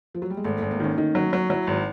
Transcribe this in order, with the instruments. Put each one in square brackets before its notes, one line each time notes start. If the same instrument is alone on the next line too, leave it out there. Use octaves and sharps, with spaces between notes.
[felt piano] F3
F#3
G3
G#3
[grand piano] G#1 [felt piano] A3
[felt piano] A3
[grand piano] G#1
[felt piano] A#3
[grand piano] D#3 [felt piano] C#4
[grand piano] D#3 [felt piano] D#4
[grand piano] F#3
F#3
[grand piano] F#3 [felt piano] E4
[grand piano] G#1